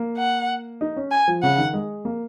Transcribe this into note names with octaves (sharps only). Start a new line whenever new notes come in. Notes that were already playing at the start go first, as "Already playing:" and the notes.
Already playing: A#3
F#5
D#4
C#4
G#5
F3
C#3 F#5
D#3
G#3
A#3